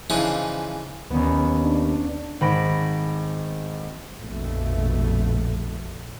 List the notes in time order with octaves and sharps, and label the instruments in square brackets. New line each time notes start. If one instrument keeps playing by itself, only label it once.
[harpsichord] C#3 E3 F3 D4 D#4
[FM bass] D#2 [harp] B3 C#4
[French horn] D4
[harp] G#1 B5 A#6 D7
[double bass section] A#1 F2 B2 A3